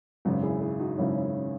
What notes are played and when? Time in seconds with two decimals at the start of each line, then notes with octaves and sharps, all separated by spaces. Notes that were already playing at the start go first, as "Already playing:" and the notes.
0.25 G#1 F#2 C#3
0.43 E4 G#4
0.61 E4 G#4
0.79 D#4 F#4
0.97 G#1 F#2 C#3 C#4 E4
1.16 C#4
1.33 C#4